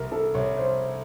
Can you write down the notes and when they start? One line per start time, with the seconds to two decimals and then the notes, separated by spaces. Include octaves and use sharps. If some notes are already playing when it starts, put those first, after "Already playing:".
Already playing: C2 A#4
0.12 A4
0.35 C2 C#5
0.57 C5